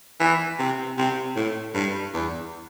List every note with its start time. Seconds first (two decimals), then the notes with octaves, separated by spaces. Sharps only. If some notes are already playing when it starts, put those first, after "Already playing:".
0.20 E3
0.59 C3
0.98 C3
1.36 A2
1.75 G2
2.14 E2